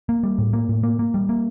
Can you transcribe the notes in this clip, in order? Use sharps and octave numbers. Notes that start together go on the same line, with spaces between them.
A#3
G3
A2
A#3
A2
A#3
A#3
G3
A#3